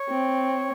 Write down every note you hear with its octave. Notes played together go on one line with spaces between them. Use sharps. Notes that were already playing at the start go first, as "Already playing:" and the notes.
Already playing: C#5
C4